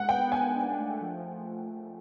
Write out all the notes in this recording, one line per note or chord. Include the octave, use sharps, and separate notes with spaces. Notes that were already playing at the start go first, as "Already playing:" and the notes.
Already playing: G#3 F#5
B3 G5
G#3 G#5
D4
A3
F3
F3